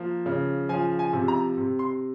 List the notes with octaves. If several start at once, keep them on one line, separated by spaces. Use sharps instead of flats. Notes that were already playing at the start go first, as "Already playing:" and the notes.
Already playing: F3 A#3
C#3
F3 G#5
G#5
C3
A#5
C3
C6